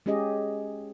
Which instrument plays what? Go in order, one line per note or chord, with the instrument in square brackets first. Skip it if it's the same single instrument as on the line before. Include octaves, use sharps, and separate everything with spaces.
[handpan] G#3 C#4 G4 G#4 D#5